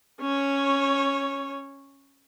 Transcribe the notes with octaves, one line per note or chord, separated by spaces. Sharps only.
C#4 C#5